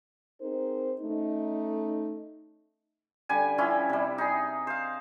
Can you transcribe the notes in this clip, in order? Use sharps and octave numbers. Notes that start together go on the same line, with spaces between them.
C4 D#4 G#4 A#4 C5
A3 C#4 D#4
D3 G3 G#5
F3 G3 C#4 E4
C3 G3
D#4 G#4
C5 F5